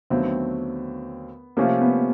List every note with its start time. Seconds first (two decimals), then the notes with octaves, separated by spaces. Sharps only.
0.10 D#2 D3 F#3 A3 B3 C4
1.57 C3 F3 A3 A#3 C#4 F4
1.81 B3